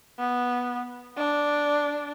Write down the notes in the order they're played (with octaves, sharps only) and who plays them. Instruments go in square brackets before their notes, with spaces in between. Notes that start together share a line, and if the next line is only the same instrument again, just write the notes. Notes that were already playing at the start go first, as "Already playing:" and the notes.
[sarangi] B3
D4